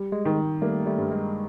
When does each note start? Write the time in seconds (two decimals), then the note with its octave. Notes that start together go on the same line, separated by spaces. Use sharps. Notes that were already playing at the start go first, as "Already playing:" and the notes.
Already playing: G3
0.12 G#3
0.25 D#3
0.62 G3 A3 A#3
0.86 G3 A3
0.98 G2
1.11 G#3